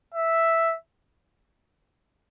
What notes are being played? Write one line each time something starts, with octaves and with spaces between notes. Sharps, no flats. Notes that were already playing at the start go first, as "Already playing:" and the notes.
E5